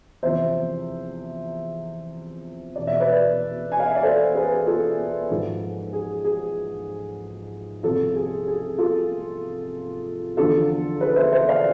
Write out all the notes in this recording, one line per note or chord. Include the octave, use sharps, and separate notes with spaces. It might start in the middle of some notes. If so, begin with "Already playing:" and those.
E2 C3 F3 C5 E5
E2 B2 D5
E5
B4 D5
G#5
F5
E5
D5
A4 C5
G#4 B4
F4 A4
G#2 F3
G#4
G#4
C2 C3 F3 F4 A4
G#4
G#4
F4 A4
E2 D3 F3 F4 A4
G#4 B4
C5 E5
C5 E5
D5 F5